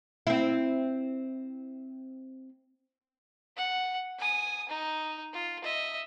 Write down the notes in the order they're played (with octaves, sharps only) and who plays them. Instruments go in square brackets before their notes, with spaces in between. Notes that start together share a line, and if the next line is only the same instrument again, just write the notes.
[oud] C4 E4
[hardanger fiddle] F#5
G#5 D#6
D#4
F4
D#5 E5